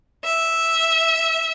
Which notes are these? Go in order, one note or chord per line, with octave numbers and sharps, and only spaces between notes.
E5